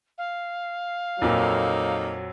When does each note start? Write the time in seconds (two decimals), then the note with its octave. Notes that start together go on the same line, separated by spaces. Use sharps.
0.18 F5
1.22 F2 A#2 F#3 A#3 D#4 A4